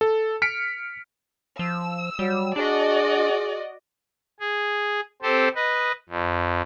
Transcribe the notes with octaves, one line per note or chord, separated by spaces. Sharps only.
A4
F6 B6 C#7 D7
F3 E6
F#3 G3
D4 F#4 G#4 D5 D#5
G#4
C4 G4 A4 C5
B4 D#5
F2